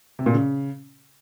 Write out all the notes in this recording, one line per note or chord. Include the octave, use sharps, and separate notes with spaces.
C3
A#2
C#3